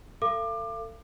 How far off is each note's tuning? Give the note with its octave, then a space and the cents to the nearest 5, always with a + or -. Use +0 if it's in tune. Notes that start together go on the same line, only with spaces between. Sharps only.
A4 +30 F5 -40 D6 +25